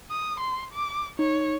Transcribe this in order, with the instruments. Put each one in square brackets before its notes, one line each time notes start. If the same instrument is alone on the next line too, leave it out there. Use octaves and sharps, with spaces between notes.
[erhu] D#6
C6
D6
[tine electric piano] D#4 [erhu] C#5